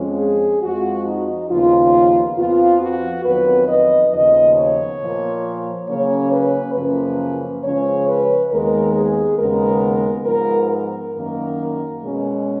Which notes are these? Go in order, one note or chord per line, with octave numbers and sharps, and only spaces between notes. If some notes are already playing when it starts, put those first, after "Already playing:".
Already playing: F2 F3 G#3 C#4
G#4
F2 F3 G#3 F#4
D#4
D#2 C#3 F3 B3 F4
F2 F3 B3 F4
F#4
F2 D#3 F#3 B3 B4
D#5
D#2 C#3 F3 B3 D#5
C#5
A#2 F3 A#3
C#3 F#3 A#3 C#4 C#5
B4
F#2 C#3 F3 A#3 C#4 B4
C#3 F3 G#3 C#4 C#5
B4
D#2 D#3 G#3 B3 A#4
G#4
D#2 C#3 G#3 B3 A#4
G#2 F3 B3 A#4
A#4
F#2 D#3 A#3
B2 G#3 C#4